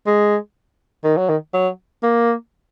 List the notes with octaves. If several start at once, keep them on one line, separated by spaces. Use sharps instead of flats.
G#3
D#3
F#3
D#3
F#3
A#3